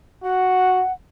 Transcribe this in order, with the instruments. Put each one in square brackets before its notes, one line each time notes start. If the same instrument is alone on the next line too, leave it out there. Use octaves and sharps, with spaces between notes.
[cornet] F#4 [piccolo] F#5